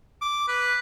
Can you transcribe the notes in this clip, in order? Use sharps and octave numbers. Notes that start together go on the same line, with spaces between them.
D6
B4